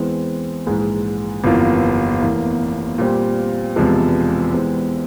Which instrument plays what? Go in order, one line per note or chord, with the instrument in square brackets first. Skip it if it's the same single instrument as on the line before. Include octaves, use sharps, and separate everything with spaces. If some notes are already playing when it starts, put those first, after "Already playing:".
Already playing: [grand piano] E2 E3 G#3 C4
A#1 G#2 E3 G#3
G1 F2 E3 A#3 F4
F1 E2 E3 A#3 E4
A#2 G3 C4 G4
E1 E2 C3 F3 G#3
E2 E3 G#3 C4 G4